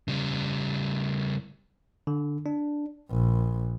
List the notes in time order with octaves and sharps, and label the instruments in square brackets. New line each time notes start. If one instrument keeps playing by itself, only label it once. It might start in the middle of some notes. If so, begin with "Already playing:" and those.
[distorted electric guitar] C#3 G3
[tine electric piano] D3
D4
[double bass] A#1